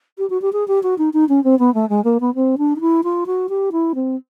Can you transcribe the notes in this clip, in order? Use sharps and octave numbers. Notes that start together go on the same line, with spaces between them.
G4
F#4
G4
G#4
G4
F#4
D#4
D#4
C#4
C4
B3
A3
G#3
A#3
B3
C4
D4
D#4
E4
F4
F#4
G4
E4
C4